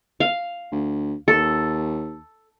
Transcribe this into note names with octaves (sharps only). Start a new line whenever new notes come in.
F5
D2
D#2 A4